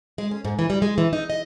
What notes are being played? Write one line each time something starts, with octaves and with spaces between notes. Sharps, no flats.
G#3
C#4
G#2
E3
G3
G#3
E3
D#4
D#5